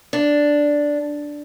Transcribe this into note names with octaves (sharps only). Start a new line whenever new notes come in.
D4